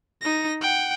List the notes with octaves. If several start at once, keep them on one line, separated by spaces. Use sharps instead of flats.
D#4 A#6
F#5 G5